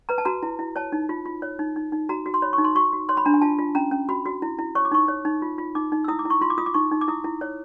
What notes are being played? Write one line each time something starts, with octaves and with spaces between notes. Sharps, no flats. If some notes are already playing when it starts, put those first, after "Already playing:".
B4 A#5
A5
F#4 A#5
E4
E4
C#5 A5
D#4
F4
F4
C#5
D#4
D#4
D#4
F#4 A#5
F#4
C6
C#5 B5
C#6
D#4
C6
F#4 C#6
F#4
C#5 C6
B5
D4 A#5
G#5
F4 A5
F4
C#4 A#5
C#4
F#4 B5
F#4
E4
E4
C#5 C#6
D6
D#4 C#6
C#5
D#4
F4
F4
D#4 D6
D#4
E6
E4 D#6
D6
E4
C#6
F4 C6
D6
F4 D#6
D6
D#4 C#6
D#4
D6
E4 D#6
E4
C#5